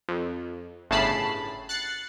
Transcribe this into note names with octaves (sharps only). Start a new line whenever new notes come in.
F2
G1 A2 C#3 A5 B5 C7
F#6 A6 C7 C#7